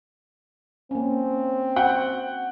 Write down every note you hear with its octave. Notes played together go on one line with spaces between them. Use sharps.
A#3 C4 C#4
F#4 F#5 G5 F#6